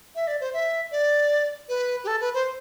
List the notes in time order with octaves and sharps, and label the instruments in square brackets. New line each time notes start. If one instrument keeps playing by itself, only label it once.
[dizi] E5
D5
C5
E5
D5
B4
G4
A4
B4
C5